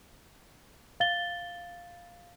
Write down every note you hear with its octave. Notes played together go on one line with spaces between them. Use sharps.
F5 A6 G7